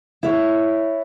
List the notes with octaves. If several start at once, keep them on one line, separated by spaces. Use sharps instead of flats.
E4 B4 C#5